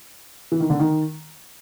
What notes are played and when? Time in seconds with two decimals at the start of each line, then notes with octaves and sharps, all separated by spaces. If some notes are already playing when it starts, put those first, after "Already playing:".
0.52 E3
0.60 D#3
0.70 D3
0.79 D#3